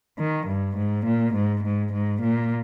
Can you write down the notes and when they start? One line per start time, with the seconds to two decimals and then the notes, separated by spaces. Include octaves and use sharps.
0.19 D#3
0.47 G2
0.77 G#2
1.05 A#2
1.34 G#2
1.63 G#2
1.93 G#2
2.22 A#2